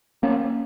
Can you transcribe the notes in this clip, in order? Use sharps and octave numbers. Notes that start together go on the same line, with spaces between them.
A#3 C#4